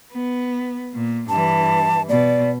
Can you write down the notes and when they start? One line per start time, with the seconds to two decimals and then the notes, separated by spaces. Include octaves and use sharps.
0.12 B3
0.94 A#2
1.29 G2 E3 A5
2.09 B2 D5